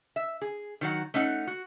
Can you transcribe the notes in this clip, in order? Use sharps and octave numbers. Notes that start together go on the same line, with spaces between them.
E5
G#4
D#3 F#3 F#5
A3 C#4 D#4 F#5
F#4